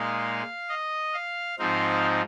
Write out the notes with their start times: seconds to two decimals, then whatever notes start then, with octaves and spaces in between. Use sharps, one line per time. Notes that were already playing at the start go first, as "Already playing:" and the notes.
Already playing: A#2 G#3 D#4 F5
0.69 D#5
1.14 F5
1.59 G#2 F3 C4 D#4 F5